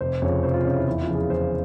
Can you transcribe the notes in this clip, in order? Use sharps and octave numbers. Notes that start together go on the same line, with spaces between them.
F1 C5
F2 C#3 C#5
F1 C5
F4
F2 C#3 C#4
E4
E2 E4
F4
C#3 F3
G#4
E2 C5